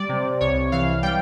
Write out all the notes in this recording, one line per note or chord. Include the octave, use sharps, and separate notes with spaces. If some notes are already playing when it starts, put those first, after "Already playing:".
Already playing: G3 D5
C3
C2 C#5
E3 F5
G3 G5